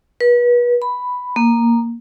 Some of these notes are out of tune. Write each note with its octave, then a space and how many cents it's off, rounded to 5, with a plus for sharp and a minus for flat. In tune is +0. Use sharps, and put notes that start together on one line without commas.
B4 -35
B5 +5
A#3 +0